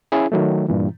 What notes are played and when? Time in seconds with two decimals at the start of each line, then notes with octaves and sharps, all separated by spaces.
0.12 C#4 E4 G#4
0.32 D#3 F#3 A3
0.68 G2 A#2 E3